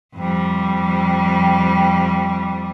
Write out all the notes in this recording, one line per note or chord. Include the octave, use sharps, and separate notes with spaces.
F2 G3